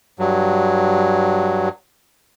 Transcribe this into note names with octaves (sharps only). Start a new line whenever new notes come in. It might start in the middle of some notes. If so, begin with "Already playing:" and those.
G2 F#3